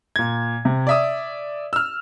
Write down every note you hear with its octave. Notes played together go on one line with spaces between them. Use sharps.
A#2 G#6
C3
D5 E5 D#6
E6 F6